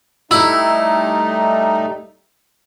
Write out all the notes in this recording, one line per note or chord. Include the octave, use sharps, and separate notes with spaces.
G3 A3 D#4 E4 E6